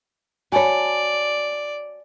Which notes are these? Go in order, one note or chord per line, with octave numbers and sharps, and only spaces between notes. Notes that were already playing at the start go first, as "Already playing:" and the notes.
F#4 C#5 D5 G#5 A5 B5